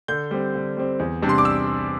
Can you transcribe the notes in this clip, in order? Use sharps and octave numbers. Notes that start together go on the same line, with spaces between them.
D3 G6
G3 C4
D3
G3 C4
E2
C3 G3 D4
C6
D6
E6